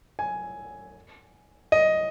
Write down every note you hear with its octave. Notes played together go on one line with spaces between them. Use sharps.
G#5
D#5